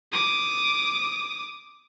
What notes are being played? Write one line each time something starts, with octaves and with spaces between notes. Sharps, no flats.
D6 D#6